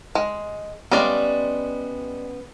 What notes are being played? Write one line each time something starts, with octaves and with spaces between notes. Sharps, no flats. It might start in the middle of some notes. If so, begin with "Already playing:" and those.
G#3
G3 G#3 B3 C#4 D5 F5